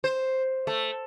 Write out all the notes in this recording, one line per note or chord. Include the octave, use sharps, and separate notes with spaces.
C5
A3